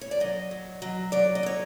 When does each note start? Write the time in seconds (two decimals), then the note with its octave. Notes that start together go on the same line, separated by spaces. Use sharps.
0.01 C#5
0.11 D5
0.20 F#3 D#5
0.51 F#3
0.82 F#3
1.12 F#3 D5
1.35 D#5
1.43 F#3 C#5